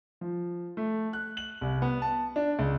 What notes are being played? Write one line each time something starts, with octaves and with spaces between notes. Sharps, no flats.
F3
A3
F#6
F#7
C2
B3
A5
D4
C#2